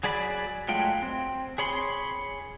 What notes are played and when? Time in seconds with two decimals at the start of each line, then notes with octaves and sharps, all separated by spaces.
0.03 F#3 G#4 D5 B5
0.68 F#3 G#3 A3 F4 G5
1.02 C4
1.58 G#4 C#5 B5 C6